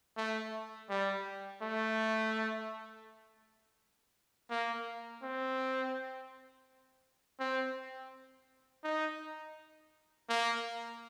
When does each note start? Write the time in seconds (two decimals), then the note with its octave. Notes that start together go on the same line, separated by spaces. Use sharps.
0.17 A3
0.90 G3
1.62 A3
4.50 A#3
5.23 C4
7.40 C4
8.84 D#4
10.29 A#3